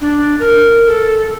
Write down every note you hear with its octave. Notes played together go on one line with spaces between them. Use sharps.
D4
A#4
A4